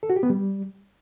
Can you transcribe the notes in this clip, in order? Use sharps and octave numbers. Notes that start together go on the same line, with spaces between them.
A4
F#4
G4
B3
G3